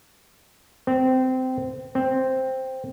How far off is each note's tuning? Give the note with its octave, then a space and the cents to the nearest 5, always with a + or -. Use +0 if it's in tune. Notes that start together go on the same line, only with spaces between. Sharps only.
C4 -20
C4 +0